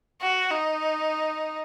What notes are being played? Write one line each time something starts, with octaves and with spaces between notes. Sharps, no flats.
F#4
D#4